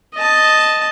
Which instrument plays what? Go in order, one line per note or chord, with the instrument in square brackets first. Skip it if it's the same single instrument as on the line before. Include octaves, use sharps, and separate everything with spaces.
[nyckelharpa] D#5 A5